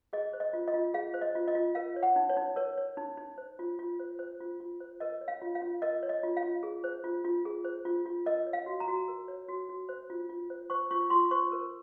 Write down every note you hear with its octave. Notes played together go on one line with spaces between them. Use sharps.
G#4 D#5
C5
D#5
F4
D#5
F4
G#4 F5
C5
D#5
F4
D#5
F4
A#4 F5
C#5
F#5
D#4
C#5
D#4
A#4 C#5
C#5
D#4
D#4
C5
F4
F4
C5
C5
F4
F4
C5
A#4 D#5
C#5
F5
F4
F5
F4
A#4 D#5
C#5
D#5
F4
F5
F4
G#4
C5
F4
F4
G#4
C5
F4
F4
A#4 D#5
C#5
F5
F#4
A#5
F#4
A#4
C#5
F#4
F#4
C5
F4
F4
C5
C5 C#6
F4 C#6
F4 C6
C5 C#6
A#4